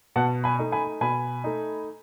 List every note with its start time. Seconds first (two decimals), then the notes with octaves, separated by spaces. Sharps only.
0.16 B2 F#5 A5
0.44 G#5 B5
0.59 A3 D#4
0.72 G#5 B5
1.01 B2 G#5 B5
1.44 A3 D#4